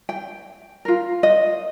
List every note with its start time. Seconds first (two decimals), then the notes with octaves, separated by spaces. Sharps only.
0.09 G5
0.85 F4 A#4
1.23 D#5